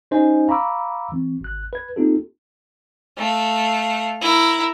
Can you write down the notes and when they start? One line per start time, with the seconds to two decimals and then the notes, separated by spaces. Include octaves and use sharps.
0.11 C#4 D#4 G4 C5 D#5 G#5
0.48 F5 A#5 B5 C#6 D6 E6
1.12 E3 C4
1.41 G#1 F#6
1.73 B4 G#6
1.96 A#3 C4 D#4 F4 G4 A4
3.18 A3 F5
4.21 E4 A#4